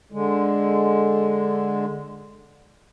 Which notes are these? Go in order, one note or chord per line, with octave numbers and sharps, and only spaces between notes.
D3 G#3